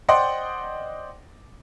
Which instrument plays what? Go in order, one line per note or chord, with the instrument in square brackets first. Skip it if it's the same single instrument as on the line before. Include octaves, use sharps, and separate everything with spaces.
[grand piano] C5 D5 D#5 F#5 G5 C6